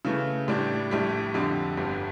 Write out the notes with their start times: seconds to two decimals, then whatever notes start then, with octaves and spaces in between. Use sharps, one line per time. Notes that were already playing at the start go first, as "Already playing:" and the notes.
0.05 C#3 E3 A3
0.48 A2 G3 D4
0.91 A#1 A2 G3
1.34 F2 D3 G3
1.77 G1 G2 D3 G3